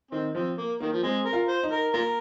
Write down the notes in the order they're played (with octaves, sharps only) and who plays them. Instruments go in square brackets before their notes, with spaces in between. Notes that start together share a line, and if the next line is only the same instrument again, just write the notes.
[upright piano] D#3 [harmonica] C4
[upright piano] F3 [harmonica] C4
[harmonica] A#3
[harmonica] D#3 [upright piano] A#3
[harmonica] F3
[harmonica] G#3 [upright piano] C4
[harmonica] A#4
[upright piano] F4
[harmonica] C5
[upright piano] D#4
[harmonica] A#4
[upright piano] A#3 [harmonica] F4 A#4